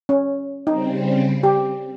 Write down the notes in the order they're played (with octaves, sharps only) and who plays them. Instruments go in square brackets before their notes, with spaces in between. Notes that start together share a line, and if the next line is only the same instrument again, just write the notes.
[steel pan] C#4
[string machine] C#3 G3 C4 [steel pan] D#4
[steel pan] G4